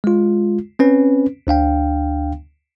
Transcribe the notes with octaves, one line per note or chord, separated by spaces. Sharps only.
G#3 F4
C4 C#4 B4
D2 D4 F5 G5